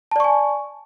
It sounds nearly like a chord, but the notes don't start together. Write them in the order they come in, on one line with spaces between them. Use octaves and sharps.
A5 D5 C#6 G#5